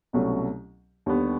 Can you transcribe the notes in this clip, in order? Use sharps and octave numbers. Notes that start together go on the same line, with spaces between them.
C2 B2 F#3 A3 C#4
D#2 D3 G3 B3